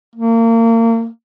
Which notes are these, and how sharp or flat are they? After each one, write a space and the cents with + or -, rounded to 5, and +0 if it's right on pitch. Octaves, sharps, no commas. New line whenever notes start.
A#3 -30